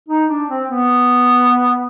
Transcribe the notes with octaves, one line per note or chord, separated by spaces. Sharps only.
D#4
D4
C4
B3